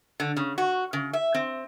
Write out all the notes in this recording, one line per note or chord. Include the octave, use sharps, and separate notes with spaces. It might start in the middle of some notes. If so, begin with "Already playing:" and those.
D3
C#3
F#4
C#3
E5
C4